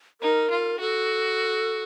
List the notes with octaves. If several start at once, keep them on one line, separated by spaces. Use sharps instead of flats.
D#4 A#4
F4
F#4 A4